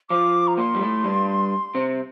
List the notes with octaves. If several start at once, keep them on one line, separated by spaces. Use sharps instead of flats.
F3 F4 D6
A#5
A#2 A#3 C6
G3
A2 A3
G2 G3
C3 C4